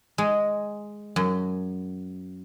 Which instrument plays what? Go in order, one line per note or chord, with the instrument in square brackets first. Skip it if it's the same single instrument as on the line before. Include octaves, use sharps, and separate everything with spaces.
[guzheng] G#3
F#2